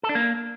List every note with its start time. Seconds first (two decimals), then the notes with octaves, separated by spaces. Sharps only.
0.03 A4
0.09 D4
0.15 A#3